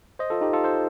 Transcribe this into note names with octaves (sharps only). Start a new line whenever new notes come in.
C5 D#5
F4 A4
D#4 G4
F4 A4
A4 C5